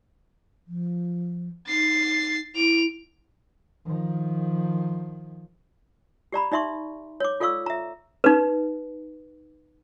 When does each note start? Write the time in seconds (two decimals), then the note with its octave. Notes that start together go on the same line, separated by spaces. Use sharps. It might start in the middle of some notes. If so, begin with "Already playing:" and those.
0.67 F3
1.67 D#4 A6 C7
2.55 E4 D7 F7
3.86 D#3 F3
6.32 G4 D5 A#5 B5
6.52 D#4 D5 E5 C6 C#6
7.20 C#5 D6
7.40 F4 A4 D5 F5 C#6 E6
7.66 E5 A#5
8.24 D#4 B4